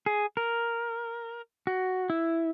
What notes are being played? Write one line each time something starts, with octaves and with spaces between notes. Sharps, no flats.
G#4
A#4
F#4
E4